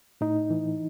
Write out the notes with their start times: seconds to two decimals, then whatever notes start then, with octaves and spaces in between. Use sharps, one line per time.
0.21 A2 D#4
0.50 E3